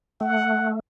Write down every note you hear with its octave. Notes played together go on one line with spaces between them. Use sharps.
A3 F#5